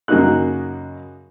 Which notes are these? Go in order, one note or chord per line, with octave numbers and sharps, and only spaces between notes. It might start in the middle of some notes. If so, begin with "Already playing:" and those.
F#2 C#3 A#3 D#4 F#4 F#6